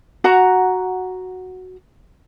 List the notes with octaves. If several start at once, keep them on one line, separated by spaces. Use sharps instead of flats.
F#4 F#5 A#5